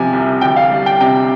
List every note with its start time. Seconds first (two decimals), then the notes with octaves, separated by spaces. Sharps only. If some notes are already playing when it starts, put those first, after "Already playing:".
Already playing: C3 F3 G#5
0.13 C2
0.41 D2 G5
0.56 F5
0.70 G3
0.86 G5
1.00 C3 G5